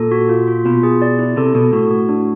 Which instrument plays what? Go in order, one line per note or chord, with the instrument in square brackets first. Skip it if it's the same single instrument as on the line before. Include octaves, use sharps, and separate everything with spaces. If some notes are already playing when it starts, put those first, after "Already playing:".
Already playing: [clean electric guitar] A#2 [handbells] A4
[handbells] F#4
F4
F4
[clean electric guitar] B2 [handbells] F4
[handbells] G#4
D5
E4
[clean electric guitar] C3 [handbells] A4
[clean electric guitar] B2 [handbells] A4
[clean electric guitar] A2 [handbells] F#4
[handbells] F#4
D4